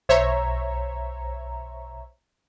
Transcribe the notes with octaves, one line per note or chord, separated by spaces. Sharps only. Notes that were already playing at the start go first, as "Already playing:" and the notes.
B1 C5 C#5 E5 A#5